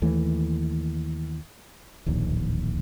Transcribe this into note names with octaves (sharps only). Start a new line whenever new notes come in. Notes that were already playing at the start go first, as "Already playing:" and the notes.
D#2 E3 A3
D1 A#1 D#2